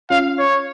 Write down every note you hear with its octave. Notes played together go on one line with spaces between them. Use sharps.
C#4 F4 F5
C#5